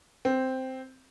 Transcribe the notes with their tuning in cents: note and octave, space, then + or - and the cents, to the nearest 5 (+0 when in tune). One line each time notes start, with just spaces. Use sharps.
C4 -5